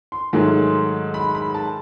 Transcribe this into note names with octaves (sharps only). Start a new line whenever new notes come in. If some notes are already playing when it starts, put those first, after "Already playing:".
C6
G#2 D#3 F#3 A3
B5
B5
A5